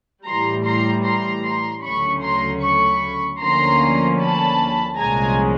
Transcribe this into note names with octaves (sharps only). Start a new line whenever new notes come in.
A2 E3 G3 A#5 C6
A#5 C6
A#5 C6
A#5 C6
D2 C#3 F#3 A3 C#4 B5 C#6
A#5 C6
B5 C#6
D2 D3 F3 A#3 C#4 A#5 C6
A5 B5
C2 A#2 F3 G#3 C#4 G#5 A#5